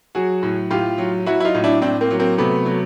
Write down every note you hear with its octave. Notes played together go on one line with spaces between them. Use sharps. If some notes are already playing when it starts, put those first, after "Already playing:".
F#3 F#4 G#4
A2
A2 F4 G4
F#3
F#3 E4 F#4
E4
D#4 F4
A2
D4 E4
A2 C4 D4
A#3 C4
F#3
A#3 C4
C3 A3 B3
F#3